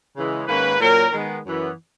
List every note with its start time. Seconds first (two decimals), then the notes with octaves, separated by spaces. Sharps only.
0.15 C#3 E3 G#3
0.47 G#2 D#3 A#3 C#4 B4
0.79 A#2 F#3 C#4 A#4
1.12 D#3 G#3 B3
1.45 F#2 E3 B3